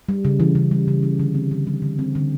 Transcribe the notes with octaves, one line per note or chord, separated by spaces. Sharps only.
G3
C#3
E3
C#3
G3
C#3
E3
D3
C4
D3
G3
D3
C4
D3